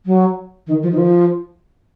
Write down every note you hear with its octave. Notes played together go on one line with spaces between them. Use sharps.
F#3
D#3
F3
D#3
F3